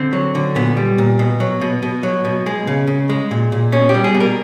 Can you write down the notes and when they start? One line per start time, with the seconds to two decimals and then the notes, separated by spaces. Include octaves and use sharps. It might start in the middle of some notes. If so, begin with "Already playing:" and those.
Already playing: D3 C4
0.13 F#3
0.35 D3
0.55 A#2 B3
0.77 G3
0.98 A#2
1.19 B2
1.40 F#3
1.61 B2
1.83 B2
2.03 F#3
2.25 B2
2.46 G#3
2.67 C#3
2.87 C#3
3.09 G#3
3.31 A#2
3.52 A#2
3.72 B2 C#4
3.89 G4
3.94 G3
4.04 G#4
4.14 B2
4.20 A#4